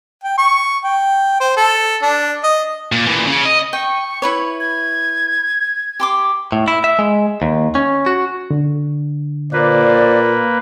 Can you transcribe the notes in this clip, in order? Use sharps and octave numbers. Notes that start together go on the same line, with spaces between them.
G5
C#6
G5
C5
A4
D4
D#5
A#2
A#2 E3
C#3
D#5
G5 C#6
E4 B4 C#5
G#6
G4 C6 D6
A2
E4
E5
G#3
D#2
C#4
F#4
D3
A#2 A#3 B4 C5 D5